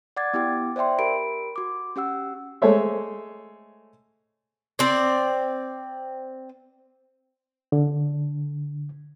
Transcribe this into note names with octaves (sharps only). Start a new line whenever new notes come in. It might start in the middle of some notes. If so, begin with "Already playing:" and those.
D5 F#5 D6 G#6 A6
B3 E4 G4 G5 D6
C5 D5 E5 G5 C6
G4 A#4 B5 D7
F#4 D6
C#4 G4 F#5 E6
G#3 A3 A4 C5 C#5 E5
C4 D5
D3